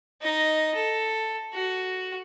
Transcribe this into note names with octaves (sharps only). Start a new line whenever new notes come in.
D#4 D#5
A4
F#4